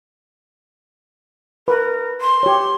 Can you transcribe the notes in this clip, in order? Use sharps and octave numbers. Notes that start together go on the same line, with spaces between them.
A#4 B4
C6
G4 C#5